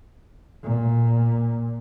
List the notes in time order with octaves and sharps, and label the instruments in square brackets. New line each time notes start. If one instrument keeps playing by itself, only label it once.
[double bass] A#2